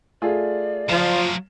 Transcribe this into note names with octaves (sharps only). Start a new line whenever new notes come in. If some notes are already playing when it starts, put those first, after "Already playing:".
A3 F4 G#4 D5
F3 F#3 F5 E7